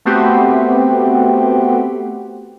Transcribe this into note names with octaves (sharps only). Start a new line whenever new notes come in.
A3 B3 C4 F#4 G4